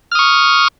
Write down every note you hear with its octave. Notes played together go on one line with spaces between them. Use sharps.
C#6 D#6 F6